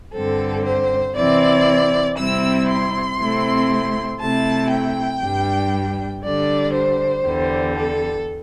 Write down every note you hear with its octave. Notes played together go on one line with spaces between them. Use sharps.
G2 D3 C4 A4
C5
C3 E3 C4 E4 D5
C3 G3 C4 E4 E6
C6
C3 A3 C4 E4
C3 A3 E4 A5
G5
G2 G3 D4
D3 G3 D4 D5
C5
E2 D3 G3
A4